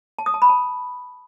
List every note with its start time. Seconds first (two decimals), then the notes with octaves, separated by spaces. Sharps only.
0.19 A5
0.26 D#6
0.34 A5
0.42 B5
0.49 A5